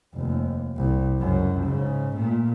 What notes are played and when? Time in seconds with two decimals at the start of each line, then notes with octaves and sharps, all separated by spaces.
0.14 F1 D#2
0.77 C2
1.19 C#2 F#2
1.63 G#2 C#3
2.16 A#2 A3